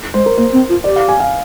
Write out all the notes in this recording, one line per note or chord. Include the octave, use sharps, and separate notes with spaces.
G#3 C5
A#4
A#3 C5
C4
F4
G4 D5
F5
G#5
F5